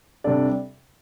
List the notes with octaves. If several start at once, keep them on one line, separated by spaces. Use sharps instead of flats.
C3 G3 D4 A4 D5